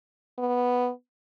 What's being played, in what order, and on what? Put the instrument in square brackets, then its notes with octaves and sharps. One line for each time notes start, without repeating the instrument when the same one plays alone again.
[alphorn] B3